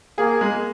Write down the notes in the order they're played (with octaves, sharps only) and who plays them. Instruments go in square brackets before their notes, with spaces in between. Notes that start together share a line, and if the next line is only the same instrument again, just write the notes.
[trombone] A#3 [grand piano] G#4
[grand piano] G#3